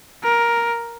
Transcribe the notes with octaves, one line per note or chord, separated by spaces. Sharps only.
A#4